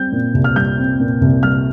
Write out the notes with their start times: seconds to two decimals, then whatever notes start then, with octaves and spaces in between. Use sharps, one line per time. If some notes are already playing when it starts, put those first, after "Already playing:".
Already playing: G3 C4 G6
0.12 A#2
0.34 C2
0.44 F6
0.56 G3 G6
0.77 C4
1.00 A#2
1.21 C2
1.43 G3 F6